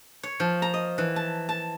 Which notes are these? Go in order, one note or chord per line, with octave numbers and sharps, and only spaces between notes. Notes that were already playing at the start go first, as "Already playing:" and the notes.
C#5
F3
A#5
D#5
E3
A5
A5